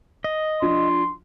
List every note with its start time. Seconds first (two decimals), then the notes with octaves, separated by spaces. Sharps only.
0.24 D#5
0.62 F3 D4 C6